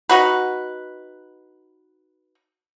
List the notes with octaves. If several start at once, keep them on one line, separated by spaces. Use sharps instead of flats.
D#4 F#4 B4